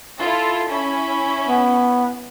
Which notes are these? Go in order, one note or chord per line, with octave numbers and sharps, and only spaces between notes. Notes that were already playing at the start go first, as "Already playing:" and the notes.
E4 F4 A4
C#4 E4 B5
B3